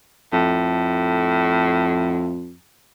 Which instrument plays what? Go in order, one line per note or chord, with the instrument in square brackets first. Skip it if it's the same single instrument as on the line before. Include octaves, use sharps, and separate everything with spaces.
[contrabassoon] F2 [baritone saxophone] A2